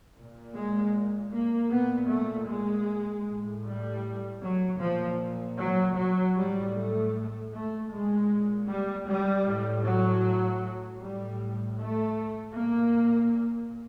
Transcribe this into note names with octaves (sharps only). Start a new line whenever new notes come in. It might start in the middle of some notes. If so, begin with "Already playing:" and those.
A#2
G#3
A#3
A#2 B3
A3
G#3
A2
G3
F#3
A#2 F3
F#3
F#3
A2 G3
A3
A3
A#2 G#3
G3
G3
A2
F#3
A2 G3
A3
A#2 A#3